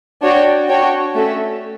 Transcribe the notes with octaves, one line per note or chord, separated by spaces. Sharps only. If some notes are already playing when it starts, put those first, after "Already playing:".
D4 F#4 C#5 G5
D4 F#4 C#5 G5
A3 C#4 F#4 A4 E5